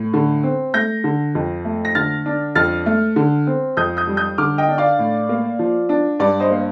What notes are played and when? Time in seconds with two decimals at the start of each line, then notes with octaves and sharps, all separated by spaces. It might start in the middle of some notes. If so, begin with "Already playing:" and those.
Already playing: A2
0.13 D3
0.43 C4
0.74 A3 G6 A#6
1.04 D3
1.35 F2
1.65 A3
1.85 A#6
1.95 D3 F6 A6
2.26 D4
2.55 F2 F6 A6
2.86 A3
3.16 D3
3.47 C4
3.77 F2 D#6 G6
3.97 D#6 G6
4.07 G3
4.17 D#6 G6
4.38 D3 D6 F6
4.58 D#5 G5
4.68 D4
4.78 D5 F5
4.99 A2
5.29 A#3
5.59 F3
5.89 D4
6.19 G2 D5
6.40 C5 D#5
6.50 A#3 C5